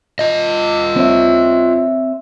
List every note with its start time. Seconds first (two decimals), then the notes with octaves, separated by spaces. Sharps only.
0.19 F4 D#5
0.96 C4 C#5 E5